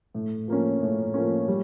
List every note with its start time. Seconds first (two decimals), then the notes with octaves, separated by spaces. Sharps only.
0.15 A2
0.48 F3 A#3 C#4
0.81 A2
1.14 F3 A#3 C#4
1.48 G3